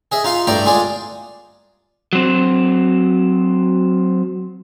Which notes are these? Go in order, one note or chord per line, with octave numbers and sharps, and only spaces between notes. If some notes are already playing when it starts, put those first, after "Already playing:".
G#4 D#5 E5
D#4 F4 F5
G2 A3 E4 D5 G5 A#5
G#3 F4 G#4 D5
F#3 C4